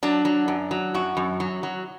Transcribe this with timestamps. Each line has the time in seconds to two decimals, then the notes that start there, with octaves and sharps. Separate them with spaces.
0.03 F#3 D4
0.25 F#3
0.48 F#2
0.71 F#3
0.94 F#2 F#4
1.17 F#2
1.40 F#3
1.63 F#3